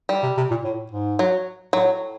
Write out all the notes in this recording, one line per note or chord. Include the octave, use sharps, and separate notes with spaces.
G3
C3
C3
A#2
A2
G#2
F#3
A2 F#3